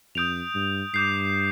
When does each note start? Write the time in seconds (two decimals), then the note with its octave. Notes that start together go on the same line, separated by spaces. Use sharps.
0.15 F2 D#6 G6 D7 F7
0.55 G2
0.94 G2 D6 G6 C7